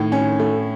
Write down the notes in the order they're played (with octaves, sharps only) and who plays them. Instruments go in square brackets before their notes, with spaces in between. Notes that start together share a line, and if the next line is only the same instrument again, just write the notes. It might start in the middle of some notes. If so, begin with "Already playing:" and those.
Already playing: [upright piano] A2 [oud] D#3
[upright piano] C#4
A3